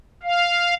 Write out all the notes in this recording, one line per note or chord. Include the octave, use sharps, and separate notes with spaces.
F5